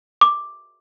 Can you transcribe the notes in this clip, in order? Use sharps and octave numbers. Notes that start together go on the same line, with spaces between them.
D6